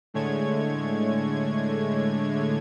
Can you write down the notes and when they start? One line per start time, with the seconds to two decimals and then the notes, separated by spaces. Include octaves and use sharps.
0.14 A2 D3 G#3 A3 C#5 G#6